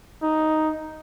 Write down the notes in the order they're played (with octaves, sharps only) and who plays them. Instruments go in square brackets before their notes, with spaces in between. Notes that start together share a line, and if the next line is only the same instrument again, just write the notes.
[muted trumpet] D#4